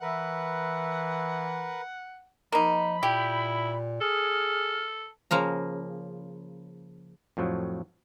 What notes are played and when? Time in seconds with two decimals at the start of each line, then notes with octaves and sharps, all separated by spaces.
0.02 E3 A#4 B4 E5 F#5
2.52 F3 A#3 D#4 B5
3.03 A#2 E4 G4
4.01 G#4 A4 F6
5.31 C#3 F3 A#3 A#5
7.37 F2 A2 F3 F#3